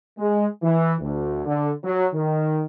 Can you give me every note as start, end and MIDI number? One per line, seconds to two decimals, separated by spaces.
0.18 0.46 56
0.62 0.94 52
1.01 1.43 38
1.46 1.71 50
1.84 2.07 54
2.14 2.64 51